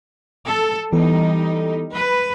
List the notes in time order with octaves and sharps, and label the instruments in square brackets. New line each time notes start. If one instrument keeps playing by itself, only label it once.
[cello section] A4
[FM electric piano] E3 B3 A4 [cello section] G3 D#4
[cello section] B4